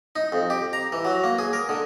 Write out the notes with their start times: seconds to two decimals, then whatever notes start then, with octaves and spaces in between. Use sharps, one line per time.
0.16 D#4
0.32 F2
0.50 G4
0.73 A#5
0.92 E3
1.05 F#3
1.24 A#3
1.39 G#4
1.53 A#4
1.69 D3